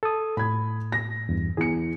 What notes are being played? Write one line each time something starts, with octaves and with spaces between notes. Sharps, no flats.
A4 D#6
A2 B5 G#6
A#6
E2 G2
E2 G#4 C#7